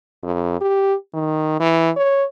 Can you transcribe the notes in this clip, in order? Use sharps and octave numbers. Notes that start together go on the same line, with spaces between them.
F2
G4
D#3
E3
C#5